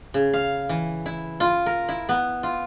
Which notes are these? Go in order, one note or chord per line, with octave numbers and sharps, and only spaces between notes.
C#3
F5
E3
E4
F4
A#4
E4
B3
F4